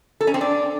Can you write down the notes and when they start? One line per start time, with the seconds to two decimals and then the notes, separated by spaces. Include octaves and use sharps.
0.21 A4
0.27 C#4
0.34 C4
0.41 D4